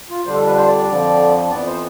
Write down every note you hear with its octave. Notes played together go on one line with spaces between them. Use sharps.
F4
F2 D3 G3 D4 C5
A4
B4
C5
D5
D5
F2 D3 F3
F2 E3 B3 D5
C5